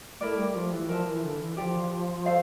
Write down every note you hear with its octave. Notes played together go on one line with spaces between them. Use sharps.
A3 E4 A#4 D5
G3
F3
E3
F3 A#4 E5 A5
E3
D3
E3
F3 G4 D5 F5
A4 C5 F5